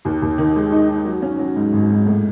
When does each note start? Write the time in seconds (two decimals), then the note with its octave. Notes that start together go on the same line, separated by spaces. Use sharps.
0.05 D#2
0.22 D#2
0.38 D#3
0.56 G#3
0.72 D#4
0.89 D#4
1.05 F#3
1.22 C#4
1.39 F#3
1.56 G#2
1.73 G#1
1.90 G#2
2.07 A2